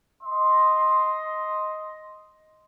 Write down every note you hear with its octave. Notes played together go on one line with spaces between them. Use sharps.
D#5 C6